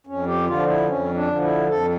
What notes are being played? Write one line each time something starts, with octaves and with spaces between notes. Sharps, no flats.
F2 C#4
G4
D3 F3 F4
E4
F2 C#4
D4
D3 F3
E4
F2 A4